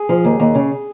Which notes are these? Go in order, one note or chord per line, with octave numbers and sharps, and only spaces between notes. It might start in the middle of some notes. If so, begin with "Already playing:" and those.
Already playing: G#4
F3
D#2
D#2
C#3